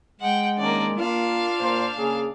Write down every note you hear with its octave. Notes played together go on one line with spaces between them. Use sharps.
G#3 F#5 G5
D#3 A#3 C#4 D4 D5
A#3 D4 F4 F5
A#2 C5
C#3 A#3 G#4